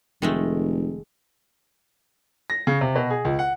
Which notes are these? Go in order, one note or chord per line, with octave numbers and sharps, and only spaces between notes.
F1 D#3 G#3 A3
A#6
C#3
C3
B2
G#4
C#2
F#5